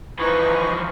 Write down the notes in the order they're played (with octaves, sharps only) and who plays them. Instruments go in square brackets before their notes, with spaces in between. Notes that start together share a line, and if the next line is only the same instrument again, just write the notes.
[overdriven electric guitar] E3 F3 [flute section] D#4 B4 C#6